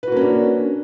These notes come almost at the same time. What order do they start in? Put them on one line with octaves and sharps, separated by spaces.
B4 F#4 A#3 C#4 D4